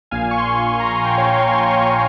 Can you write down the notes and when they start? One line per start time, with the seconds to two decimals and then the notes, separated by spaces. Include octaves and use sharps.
0.11 A#1 A#2 F5 G#5
0.31 C#6
0.38 G#5 C6
0.80 A#5
0.93 G#5
1.05 G5
1.18 C#5 F5
1.32 G5
1.35 F5 G#5
1.53 G#5 C6
1.70 G#5 C6